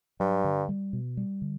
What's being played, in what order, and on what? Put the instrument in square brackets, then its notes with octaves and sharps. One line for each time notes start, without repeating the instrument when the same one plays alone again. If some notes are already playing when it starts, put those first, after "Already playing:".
[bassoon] G2 [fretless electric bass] F#3
[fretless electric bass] D3
G3
B2
G3
D3